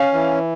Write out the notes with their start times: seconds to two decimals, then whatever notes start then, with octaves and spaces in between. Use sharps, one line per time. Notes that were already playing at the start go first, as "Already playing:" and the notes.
Already playing: C#4 F5
0.13 E3